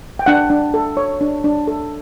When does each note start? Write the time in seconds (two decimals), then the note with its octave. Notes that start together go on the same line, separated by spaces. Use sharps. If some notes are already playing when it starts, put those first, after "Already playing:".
0.19 G5
0.26 D4 F#5
0.50 D4
0.74 A4
0.97 C#5
1.21 D4
1.44 D4
1.67 A4